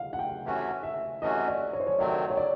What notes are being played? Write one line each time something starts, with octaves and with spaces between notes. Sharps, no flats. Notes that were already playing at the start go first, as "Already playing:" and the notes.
Already playing: F5 F#5
F#5
G5
C3 E3 A3 C#4 F#4
E5
C3 E3 A3 C#4 F#4 D#5
D5
C#5
C5
C#5
C3 D#3 F#3 A3 C4 D5
C#5
D5